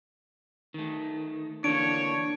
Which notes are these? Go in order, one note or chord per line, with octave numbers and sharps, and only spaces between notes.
D#3 A3
D3 E3 A#3 D4 C#5 D7